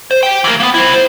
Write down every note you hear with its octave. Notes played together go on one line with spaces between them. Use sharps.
C5
G4 G5
E3 A#4
A#3 B3
E4 C5
C5